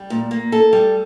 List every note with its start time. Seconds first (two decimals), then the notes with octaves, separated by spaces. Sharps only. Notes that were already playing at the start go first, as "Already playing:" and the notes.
Already playing: G3
0.10 A#2
0.31 A#3
0.52 A4
0.73 G3